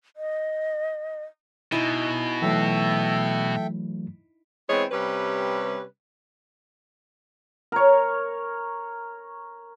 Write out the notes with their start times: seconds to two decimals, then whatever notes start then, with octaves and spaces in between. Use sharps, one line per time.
0.17 D#5
1.72 B2 D#4 E4 G#5
2.42 E3 F#3 A3 A4 E5 G5
4.69 E3 G#3 B3 C4 C#5
4.92 C3 G3 C#4 B4
7.72 A#4 C#5